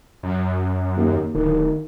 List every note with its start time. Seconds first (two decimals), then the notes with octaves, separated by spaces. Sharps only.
0.23 F#2
0.97 D#2
1.35 D1 D#3